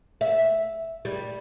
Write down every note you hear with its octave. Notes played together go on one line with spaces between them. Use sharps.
E5
G3